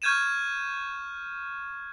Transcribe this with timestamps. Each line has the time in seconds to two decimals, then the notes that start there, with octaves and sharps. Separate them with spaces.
0.02 C#6 F6 G6 G#6 D#7 E7